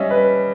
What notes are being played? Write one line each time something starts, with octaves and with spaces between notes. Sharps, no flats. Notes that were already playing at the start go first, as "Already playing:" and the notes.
Already playing: G3 C#4 D#5 E5
B4